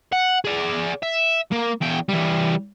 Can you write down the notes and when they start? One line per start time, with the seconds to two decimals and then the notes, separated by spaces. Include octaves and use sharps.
0.12 F#5
0.45 G#4 D5
1.03 E5
1.53 A#3
1.81 E2 G5
2.09 E3 G3